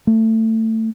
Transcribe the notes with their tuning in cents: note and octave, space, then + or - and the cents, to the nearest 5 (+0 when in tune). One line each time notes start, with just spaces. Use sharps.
A3 +20